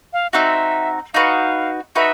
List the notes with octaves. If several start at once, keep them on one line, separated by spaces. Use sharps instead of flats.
F5
C4 D#4 F#4 E5
D#4 F#4 B4 F5
D#4 F#4 B4 E5